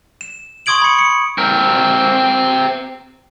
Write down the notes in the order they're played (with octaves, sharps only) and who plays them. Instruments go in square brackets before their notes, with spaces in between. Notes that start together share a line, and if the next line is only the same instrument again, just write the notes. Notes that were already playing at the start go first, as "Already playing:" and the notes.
[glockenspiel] E7
C6 C#6 D#6 G#6 D7 F#7
B5 C#7
C#7
[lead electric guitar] C4 A#4